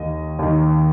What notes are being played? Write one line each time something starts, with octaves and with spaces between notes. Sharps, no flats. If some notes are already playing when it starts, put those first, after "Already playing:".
Already playing: D#2 D#3 D#5
D#2 D#3